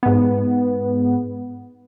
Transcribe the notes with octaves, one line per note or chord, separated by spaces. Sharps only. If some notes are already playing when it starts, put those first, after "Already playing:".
G#2 B3